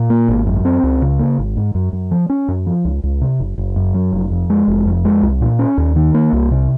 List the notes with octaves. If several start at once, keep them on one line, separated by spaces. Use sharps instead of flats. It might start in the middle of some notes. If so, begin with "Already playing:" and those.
Already playing: A#2
A#3
G#1
F#2
C4
C#2
C#3
A#3
G#1
G#2
F#2
F#2
F3
C#4
F#2
F3
C#2
C#2
C3
F#1
F#1
F#2
F#3
F1
F2
G#3
F1
F2
G#3
C2
A#2
C#4
D#2
D#3
A#3
C2
C3